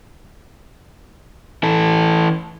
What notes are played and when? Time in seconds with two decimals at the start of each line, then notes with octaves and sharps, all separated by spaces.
1.63 E3 A4